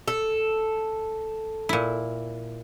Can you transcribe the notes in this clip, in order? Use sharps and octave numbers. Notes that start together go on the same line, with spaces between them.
A4
A#2 E4